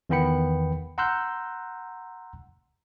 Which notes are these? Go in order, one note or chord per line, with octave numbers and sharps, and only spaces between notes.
E2 D#3 B3 G5 B5 C#7
F#5 A#5 C6 E6 F#6 G6